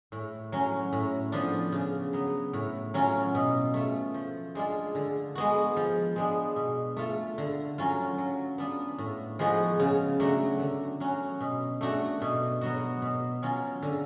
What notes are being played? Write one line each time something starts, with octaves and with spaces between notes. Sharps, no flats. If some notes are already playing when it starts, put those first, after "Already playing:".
A2
F#3 C#4
A2
F3 B3 D4 F4
C#3
F#3 B3
A2
F#3 C#4 F4
B2
A3 F4
F3
G#3 D4 F4
D3
G#3 B3 F#4
F3
G#3 B3 D4
B2
A3 F4
D3
F#3 C#4 F4
F#3
B3 D4 F4
A2
F3 G#3 B3 F#4
C#3
F#3 A3 D4 F#4
D3
F#3 C#4 F#4
B2
A3 D4 F#4
B2
F#3 B3 F#4
B2
F#3 C#4 F4
D3